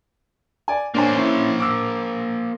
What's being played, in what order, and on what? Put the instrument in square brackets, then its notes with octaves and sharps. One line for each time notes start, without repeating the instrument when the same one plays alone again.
[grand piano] D5 G#5
[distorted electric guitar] A#3 C5 [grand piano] D4 C#5 G#5
[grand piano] C#4 E4
D6 E6